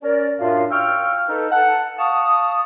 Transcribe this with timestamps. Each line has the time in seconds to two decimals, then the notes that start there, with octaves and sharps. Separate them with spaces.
0.03 C#4 A#4 D5
0.40 F#2 A2 D4 F4 E5 F5
0.71 F5 G5 C#6 E6 F6
1.29 D#4 A4 B4
1.52 F#5 A5
1.98 F5 A5 C#6 D#6